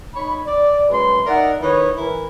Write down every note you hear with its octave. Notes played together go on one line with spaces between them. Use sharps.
D#4 C#5 B5
D5
F#2 F#3 G#3 B4 C6
D#4 A#4 D5 E5 F#5
D#3 D#4 E4 B4 C#5
E3 E4 A#4